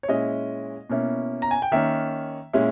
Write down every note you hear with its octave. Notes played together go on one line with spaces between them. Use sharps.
C#5
A#2 G#3 C#4 E4 D#5
B2 A#3 C#4 E4
A#5
G#5
G5
D#3 A#3 C#4 E5
A#2 G#3 C#4 E4